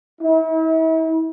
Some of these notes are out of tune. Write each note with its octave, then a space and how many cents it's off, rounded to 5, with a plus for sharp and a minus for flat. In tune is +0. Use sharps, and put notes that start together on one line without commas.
E4 -40